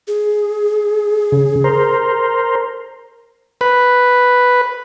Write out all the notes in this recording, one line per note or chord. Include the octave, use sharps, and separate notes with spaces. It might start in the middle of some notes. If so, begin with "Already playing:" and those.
G#4
C#3
A#4 C5
B4